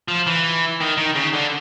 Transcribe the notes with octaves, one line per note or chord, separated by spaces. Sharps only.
F3
E3
D#3
D#3
C#3
D3